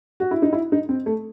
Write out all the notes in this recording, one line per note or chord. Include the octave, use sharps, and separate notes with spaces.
F#4
E4
D#4
E4
D#4
C4
A3